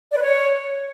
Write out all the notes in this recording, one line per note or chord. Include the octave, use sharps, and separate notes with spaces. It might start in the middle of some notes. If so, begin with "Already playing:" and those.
D5
B4
C#5